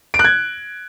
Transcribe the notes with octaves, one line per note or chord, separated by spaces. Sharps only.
D7
F#6
G#6